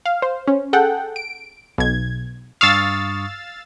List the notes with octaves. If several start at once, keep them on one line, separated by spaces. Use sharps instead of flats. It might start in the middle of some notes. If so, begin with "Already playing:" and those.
F5
C5
C#4
G#4 A4 F#5 G5
D7
B1 G#6
G2 F5 C#6 D#6 E6 A6